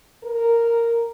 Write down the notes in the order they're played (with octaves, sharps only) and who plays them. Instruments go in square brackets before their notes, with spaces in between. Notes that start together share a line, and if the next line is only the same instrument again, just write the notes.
[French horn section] A#4